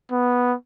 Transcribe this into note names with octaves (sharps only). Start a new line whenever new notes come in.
B3